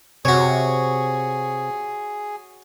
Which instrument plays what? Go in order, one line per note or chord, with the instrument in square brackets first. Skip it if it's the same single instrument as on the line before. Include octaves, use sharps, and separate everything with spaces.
[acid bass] C3 [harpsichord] F#4 C#5 [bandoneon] G#4